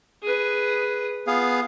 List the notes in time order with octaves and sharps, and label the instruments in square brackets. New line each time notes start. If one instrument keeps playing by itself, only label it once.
[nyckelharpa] G#4 B4
[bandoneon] B3 G#4 F5 [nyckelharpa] F4